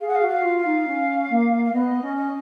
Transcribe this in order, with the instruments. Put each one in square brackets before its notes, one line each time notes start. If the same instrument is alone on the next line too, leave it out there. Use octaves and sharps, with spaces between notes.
[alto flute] G#4 [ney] F5
[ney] F#5
F5
[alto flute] F#4
[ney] F5
[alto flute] F4
[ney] F5
[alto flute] D#4
C#4
A#3
[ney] F5
[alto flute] B3 [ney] D#5
[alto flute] C#4
[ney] D#5